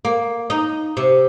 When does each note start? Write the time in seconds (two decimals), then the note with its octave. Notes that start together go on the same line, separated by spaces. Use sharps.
0.05 A#3
0.50 D#4
0.97 C3